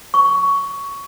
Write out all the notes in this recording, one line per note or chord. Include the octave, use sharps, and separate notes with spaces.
C#6